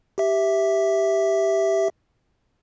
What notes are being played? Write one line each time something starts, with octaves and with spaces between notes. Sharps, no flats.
G4 E5